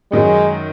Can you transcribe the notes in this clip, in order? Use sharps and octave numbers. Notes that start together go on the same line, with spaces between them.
F#2 D#3 F#3 G#3